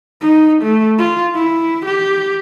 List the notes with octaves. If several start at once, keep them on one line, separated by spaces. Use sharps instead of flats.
D#4
A3
F4
E4
G4